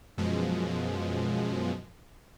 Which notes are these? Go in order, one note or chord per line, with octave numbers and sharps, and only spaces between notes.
F#2 B2 F3 G#3